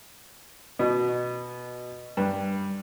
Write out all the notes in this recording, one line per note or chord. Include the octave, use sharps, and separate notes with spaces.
B2
G2